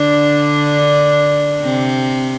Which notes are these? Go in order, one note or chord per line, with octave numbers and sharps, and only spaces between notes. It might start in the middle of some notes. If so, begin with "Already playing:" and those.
Already playing: D3 D4
C3 C4